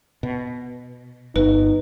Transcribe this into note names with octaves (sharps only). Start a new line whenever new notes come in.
B2
G1 D#4 B4